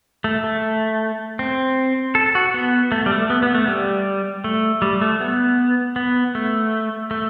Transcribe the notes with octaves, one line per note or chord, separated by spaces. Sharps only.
A3
A3
C4
A4
F#4
B3
A3
G3
A3
B3
B3
A3
G3
A3
G3
A3
B3
B3
A3
A3